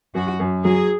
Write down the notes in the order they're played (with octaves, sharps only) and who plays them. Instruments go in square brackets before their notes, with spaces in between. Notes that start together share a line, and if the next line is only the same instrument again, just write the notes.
[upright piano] F#2 [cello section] F#4
[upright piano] F#2
[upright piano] F#3 [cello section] G#4